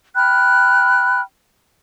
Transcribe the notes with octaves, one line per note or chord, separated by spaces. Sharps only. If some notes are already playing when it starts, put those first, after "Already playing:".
G5 B5 F6 F#6